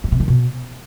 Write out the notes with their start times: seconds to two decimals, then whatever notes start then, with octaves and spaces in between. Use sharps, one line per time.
0.04 G2
0.12 C3
0.20 D#3
0.28 B2